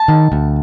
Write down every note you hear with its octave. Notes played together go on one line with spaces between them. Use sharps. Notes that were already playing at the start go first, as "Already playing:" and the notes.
Already playing: A5
D#3
D2